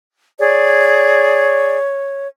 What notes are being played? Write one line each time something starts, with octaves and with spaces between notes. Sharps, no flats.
G#4 C#5 D5